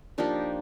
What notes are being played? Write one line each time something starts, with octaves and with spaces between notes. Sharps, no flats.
F3 A#3 D4 D#4 G4